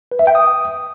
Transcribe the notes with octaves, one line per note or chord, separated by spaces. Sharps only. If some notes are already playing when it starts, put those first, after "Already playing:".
B4
E5
G5
D#6